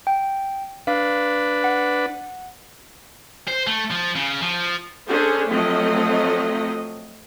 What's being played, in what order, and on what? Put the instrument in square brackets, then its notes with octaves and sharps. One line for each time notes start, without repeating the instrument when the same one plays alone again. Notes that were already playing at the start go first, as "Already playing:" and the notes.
[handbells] G5
[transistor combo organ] D4 B4 [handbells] F5
[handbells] F#5
[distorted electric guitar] C5
A3
F3
C#3
F3
[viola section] C#4 D4 G#4 A4 C5
F3 F#3 A3 C4 A4 D#5